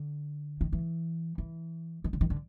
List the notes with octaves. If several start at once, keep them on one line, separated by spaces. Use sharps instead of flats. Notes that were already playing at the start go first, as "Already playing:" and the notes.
Already playing: D3
D#3
E3
E3
D#3
D3
D#3
D3